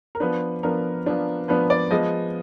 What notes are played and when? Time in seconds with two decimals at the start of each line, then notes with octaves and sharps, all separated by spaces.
0.15 A#4
0.20 F3 B3 D4 B4
0.63 F3 B3 D4 A#4
1.06 F3 B3 D4
1.48 F3 B3 D4 B4
1.70 D5
1.91 F3 G#3 B3 D#5